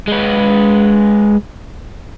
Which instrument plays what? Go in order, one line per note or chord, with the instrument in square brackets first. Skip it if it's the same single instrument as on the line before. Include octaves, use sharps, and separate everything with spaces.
[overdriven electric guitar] G#3 B4